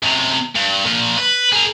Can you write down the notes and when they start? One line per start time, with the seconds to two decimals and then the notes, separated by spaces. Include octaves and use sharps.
0.03 F#2 C3
0.55 G2
0.86 A#2 F3
1.18 B4
1.52 G#4 A#4